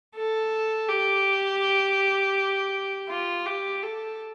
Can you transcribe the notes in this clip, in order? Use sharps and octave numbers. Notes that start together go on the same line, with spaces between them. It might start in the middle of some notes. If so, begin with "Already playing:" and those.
A4
G4
F4
G4
A4